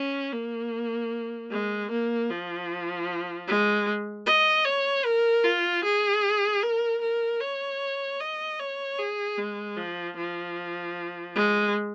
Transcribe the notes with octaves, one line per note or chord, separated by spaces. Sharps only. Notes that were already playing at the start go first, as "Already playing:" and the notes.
Already playing: C#4
A#3
G#3
A#3
F3
G#3
D#5
C#5
A#4
F4
G#4
A#4
A#4
C#5
D#5
C#5
G#4
G#3
F3
F3
G#3